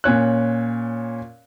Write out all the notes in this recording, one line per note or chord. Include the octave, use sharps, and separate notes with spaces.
A#2 C#4 C#5 F#6